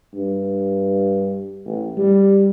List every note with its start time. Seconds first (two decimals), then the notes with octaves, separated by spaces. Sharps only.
0.15 G2
1.66 A1
1.98 G3